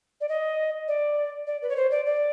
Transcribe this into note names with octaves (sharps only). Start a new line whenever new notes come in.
D5
D#5
D5
D5
B4
C#5
C5
D5
D5